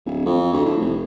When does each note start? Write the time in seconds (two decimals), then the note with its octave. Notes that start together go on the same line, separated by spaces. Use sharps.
0.06 D1
0.26 F2
0.53 D2
0.66 A2
0.80 F1